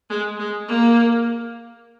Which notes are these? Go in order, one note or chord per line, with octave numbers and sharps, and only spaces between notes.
G#3
G#3
A#3